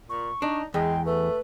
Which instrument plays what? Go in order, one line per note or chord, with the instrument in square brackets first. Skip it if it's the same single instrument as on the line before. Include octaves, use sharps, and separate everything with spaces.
[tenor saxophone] A#2 [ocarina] C#6
[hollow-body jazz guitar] D4 [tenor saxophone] D#4
[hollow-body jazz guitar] E2 [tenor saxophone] G#3 [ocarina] G5
[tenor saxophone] A3 [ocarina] B4